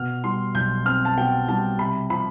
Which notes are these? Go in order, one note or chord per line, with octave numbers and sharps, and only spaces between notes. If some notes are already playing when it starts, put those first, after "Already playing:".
Already playing: B2 F6
G3 C6
B1 G6
C4 F6
A5
B2 G5
G3 A5
C3 B5
F3 B5